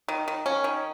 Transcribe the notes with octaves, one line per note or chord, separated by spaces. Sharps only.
D#3
D#3
C#4
D#3